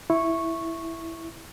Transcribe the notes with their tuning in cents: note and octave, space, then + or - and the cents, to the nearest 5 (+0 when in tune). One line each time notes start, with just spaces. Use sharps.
E4 +0 C#6 -10